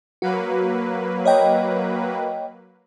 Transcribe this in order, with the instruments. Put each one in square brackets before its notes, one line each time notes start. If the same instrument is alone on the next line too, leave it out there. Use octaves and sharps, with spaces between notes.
[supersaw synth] F#3 A#3 B4 [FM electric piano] F#4
[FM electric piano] C#5 D#5 G5